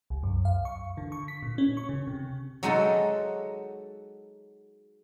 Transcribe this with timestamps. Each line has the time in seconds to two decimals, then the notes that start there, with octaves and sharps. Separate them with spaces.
0.10 C2
0.23 F#2
0.45 F5
0.65 C#6
0.97 D3
1.12 C#6
1.28 B6
1.42 A#2
1.58 C#4
1.77 C#6
1.89 C#3
2.07 C3
2.63 F#3 G#3 D#4 F#4 A4